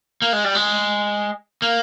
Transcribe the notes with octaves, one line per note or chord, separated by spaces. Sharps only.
A#3
G#3
G3
G#3
A#3